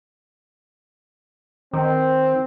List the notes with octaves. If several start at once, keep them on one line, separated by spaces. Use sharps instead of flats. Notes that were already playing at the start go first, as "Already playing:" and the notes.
D#3 C4